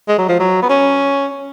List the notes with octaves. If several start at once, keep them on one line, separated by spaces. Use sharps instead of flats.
G#3
F#3
F3
F#3
B3
C#4